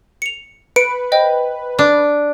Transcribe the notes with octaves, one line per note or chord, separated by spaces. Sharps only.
C#7 F7
B4 C#7 D7
C5 D#5 G5
D4